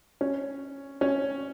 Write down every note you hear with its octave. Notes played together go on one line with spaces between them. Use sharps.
C#4
C#4